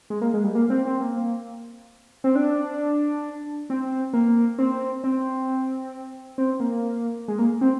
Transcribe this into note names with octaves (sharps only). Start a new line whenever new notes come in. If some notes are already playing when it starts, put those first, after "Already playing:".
G#3
A#3
G#3
G3
A#3
C4
C4
A#3
C4
D4
C4
A#3
C4
C4
C4
A#3
G#3
A#3
C4